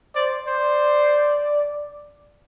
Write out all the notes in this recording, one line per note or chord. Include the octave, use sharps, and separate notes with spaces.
C5 D5
C5 D5